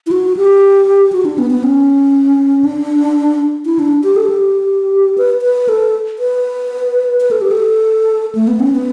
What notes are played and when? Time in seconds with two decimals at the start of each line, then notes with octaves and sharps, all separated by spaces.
0.07 E4
0.11 F#4
0.37 G4
1.12 F#4
1.25 D4
1.38 B3
1.50 B3
1.63 C#4
2.64 D4
3.66 E4
3.79 D4
4.04 G4
4.16 A4
4.30 G4
5.18 B4
5.42 B4
5.69 A4
6.19 B4
7.20 B4
7.31 A4
7.41 G4
7.51 A4
8.35 A3
8.47 B3
8.60 C#4
8.73 B3